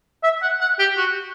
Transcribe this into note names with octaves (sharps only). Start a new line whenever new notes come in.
E5
F#5
F#5
G4
F#4